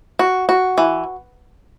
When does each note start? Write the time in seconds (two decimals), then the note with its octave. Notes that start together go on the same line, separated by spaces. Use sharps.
0.19 F#4
0.49 F#4
0.78 E3